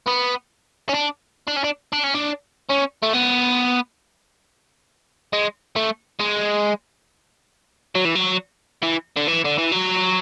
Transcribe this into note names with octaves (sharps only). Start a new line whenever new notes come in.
B3
C#4
D4
D4
C#4
D4
D4
C#4
D4
C#4
A3
B3
G#3
A3
G#3
F#3
E3
F#3
E3
D3
E3
D3
E3
F#3